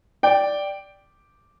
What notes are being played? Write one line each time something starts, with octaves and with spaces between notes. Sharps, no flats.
D5 G5